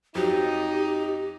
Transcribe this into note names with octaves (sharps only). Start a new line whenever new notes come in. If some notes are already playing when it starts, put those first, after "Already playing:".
F2 F3 F#3 D#4 G4